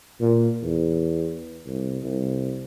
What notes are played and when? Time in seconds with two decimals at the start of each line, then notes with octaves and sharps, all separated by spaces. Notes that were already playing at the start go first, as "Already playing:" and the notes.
0.20 A#2
0.63 E2
1.66 C2
2.03 C2